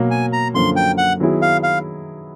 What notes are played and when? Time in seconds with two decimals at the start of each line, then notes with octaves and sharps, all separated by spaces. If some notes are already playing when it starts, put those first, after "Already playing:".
Already playing: B2 F#3 A#3
0.11 G#5
0.33 A#5
0.54 F#2 D3 F3 A#3 C6
0.76 G5
0.98 F#5
1.20 D#3 F#3 B3 E4 G#4
1.42 F5
1.63 F5